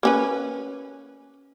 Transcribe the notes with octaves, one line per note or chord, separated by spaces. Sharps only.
A#3 C#4 B4